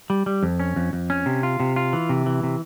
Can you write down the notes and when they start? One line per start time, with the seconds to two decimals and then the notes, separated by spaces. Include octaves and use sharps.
0.10 G3
0.26 G3
0.43 F2
0.60 C#4
0.76 F2
0.93 F2
1.10 C#4
1.26 C3
1.43 F4
1.60 C3
1.76 F4
1.93 E3
2.09 C3
2.26 E3
2.43 C3